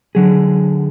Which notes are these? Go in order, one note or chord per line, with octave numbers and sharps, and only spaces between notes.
D3 F#3 G#4